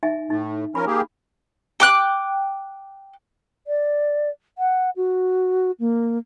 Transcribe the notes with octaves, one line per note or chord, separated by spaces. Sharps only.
D#4 E5 G#5
A2 A3 D#4
F3 C#4 A#4 B5
A#3 G4 G#4
G5 D6 F#6
D5
F#5
F#4
A#3